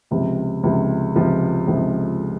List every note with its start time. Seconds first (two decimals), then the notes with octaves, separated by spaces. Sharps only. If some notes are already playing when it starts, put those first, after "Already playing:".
0.11 C#2 C3 F3
0.63 C#2 C3 F3
1.16 C#2 C3 F3
1.68 C#2 C3 F3